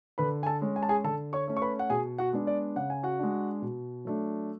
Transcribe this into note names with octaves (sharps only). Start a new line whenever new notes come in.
D3 B4 B5
G#5
A4 A5
G#3 C#4
G#5
A5
G#4 G#5
D3 A4 A5
C#5 C#6
A3 C#4
C#6
B4 B5
F#5
B2 G#4 G#5
F#4 F#5
G#3 B3 D4
D5
C#3 F#5
G#5
F#4 F#5
G#3 D4
B2
F#3 A3 D4